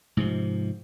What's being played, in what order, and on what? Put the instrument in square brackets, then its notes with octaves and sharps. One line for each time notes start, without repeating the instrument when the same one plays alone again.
[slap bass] G#2 C3 F3